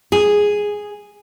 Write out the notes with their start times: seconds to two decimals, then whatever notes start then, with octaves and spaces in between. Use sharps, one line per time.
0.12 G#4